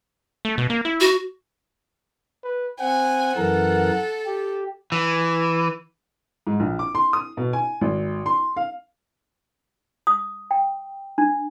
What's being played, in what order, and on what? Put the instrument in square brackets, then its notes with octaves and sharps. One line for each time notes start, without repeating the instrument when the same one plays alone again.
[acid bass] A3
B2
A#3
E4
[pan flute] F#4
[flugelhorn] B4
[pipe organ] C4 [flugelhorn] F#5 [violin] G#5
[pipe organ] F#2 E3 A#4 [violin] A4
[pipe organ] G4
[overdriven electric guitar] E3
[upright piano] G#2
A#1
D6
C6
D#6
B2
G#5
G#1
C6
F5
[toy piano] D#6
G5
D4